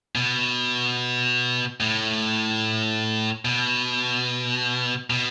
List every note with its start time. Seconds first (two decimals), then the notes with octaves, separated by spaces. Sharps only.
0.15 B2
1.80 A2
3.45 B2
5.10 B2